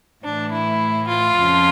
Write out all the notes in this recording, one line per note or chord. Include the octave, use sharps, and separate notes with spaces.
A2 E3 D4
E4
F4
F2 C#3 F3